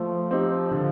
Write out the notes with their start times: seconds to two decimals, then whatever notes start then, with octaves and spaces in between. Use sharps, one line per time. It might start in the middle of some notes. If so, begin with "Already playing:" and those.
Already playing: F3 A3
0.31 C4 D#4 G4
0.71 D3